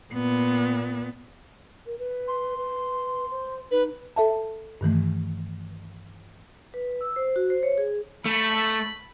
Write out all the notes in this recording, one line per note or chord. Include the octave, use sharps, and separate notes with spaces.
A#2 B3
A#4
B4
C6
B4
C5
D#4 B4
A4 E5 A5
G2 D#3 E3 A3
B4
E6
C5
F#4
C5
C#5
G#4
A3 B5